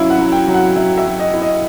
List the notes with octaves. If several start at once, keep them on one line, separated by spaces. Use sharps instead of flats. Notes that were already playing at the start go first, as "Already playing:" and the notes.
Already playing: F#3 C#4 E4 E5 F5
F#5
F#3
G5
F#3
F#5
F#3 E5
E5
F#3
D#5
E4
D#5